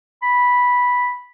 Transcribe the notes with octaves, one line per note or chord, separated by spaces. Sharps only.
B5